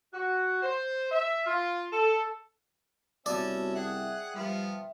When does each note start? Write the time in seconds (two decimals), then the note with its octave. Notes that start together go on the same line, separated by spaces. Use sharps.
0.14 F#4
0.63 C5
1.12 E5
1.46 F4
1.93 A4
3.26 C2 B3 C#4 F#4 D5 E5 A5
3.76 G#4 E5 F#5 G5
4.35 F3 G3 B3 F4